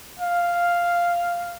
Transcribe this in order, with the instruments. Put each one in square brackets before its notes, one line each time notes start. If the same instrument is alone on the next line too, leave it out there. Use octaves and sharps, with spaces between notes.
[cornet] F5